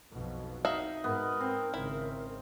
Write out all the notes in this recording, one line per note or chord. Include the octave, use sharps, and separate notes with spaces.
B1 F2 B2
D#4 F#4 E5 F5
G#2 B3 A#4
C4
G#1 C#3 E4